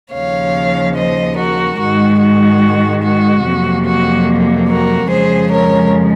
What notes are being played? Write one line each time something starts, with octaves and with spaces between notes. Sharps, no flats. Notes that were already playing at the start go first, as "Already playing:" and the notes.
D#2 C#3 F3 C#5 F5
C5 D#5
F#4 A#4
G#2 D#3 G#3 F#4
F#4
F#4
F2 C3 F#3 A#3
F#4
F#4 A#4
F2 C#3 F3 G#3 G#4 C5
A#4 C#5